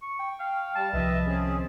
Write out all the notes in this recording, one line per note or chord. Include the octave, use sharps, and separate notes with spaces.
C#6
G5
F5 G5
G3 A5
C2 D#3 F3 B4 D#5 E5
C4 C#4 G#4